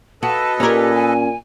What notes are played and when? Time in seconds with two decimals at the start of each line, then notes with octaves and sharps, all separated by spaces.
0.23 F#4 A4 B4 D#5 A5
0.60 A#2 C#4 G4 A#4
0.95 G#5